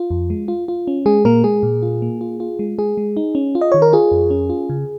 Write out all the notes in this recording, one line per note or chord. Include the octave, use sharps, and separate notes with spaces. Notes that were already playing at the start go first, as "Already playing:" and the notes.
Already playing: F4
F2
G#3
F4
F4
C#4
G#3 G#4
A#2 A#3 A#4
G#3 G#4
A#2
F4
A#3
F4
F4
G#3
G#3 G#4
G#3
D#4
C#4
F4
D#5
D#3 C#5
A#4
F4 G#4
F2
C#4
F4
C#3